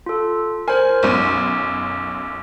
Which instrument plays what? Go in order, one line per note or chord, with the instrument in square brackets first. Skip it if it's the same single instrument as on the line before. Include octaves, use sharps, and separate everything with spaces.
[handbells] F4 A4
[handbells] A#4 C5 [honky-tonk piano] G#5
[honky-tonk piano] B1 F#2 D#7 [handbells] C#6